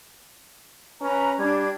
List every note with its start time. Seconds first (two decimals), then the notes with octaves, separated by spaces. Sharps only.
1.01 C#4 B4 A#5
1.39 G3 D4 G#6